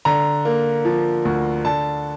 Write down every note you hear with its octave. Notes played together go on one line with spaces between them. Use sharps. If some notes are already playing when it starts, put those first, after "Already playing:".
D3 A#5
A#3
F3
D2
D3 A5